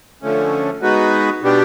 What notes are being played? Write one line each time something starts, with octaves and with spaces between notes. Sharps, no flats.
D3 F3 A3 C#4
G#3 B3 D#4 F#4 B4
B2 G3 B3 D4 G4